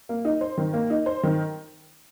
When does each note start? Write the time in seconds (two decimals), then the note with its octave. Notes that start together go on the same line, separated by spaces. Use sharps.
0.09 A#3
0.25 D#4
0.41 C5
0.58 D#3
0.73 A#3
0.90 D#4
1.06 C5
1.23 D#3